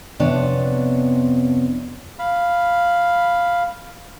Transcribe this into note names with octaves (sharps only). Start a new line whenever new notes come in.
F2 C3 B3 D4 C#5
F5 B5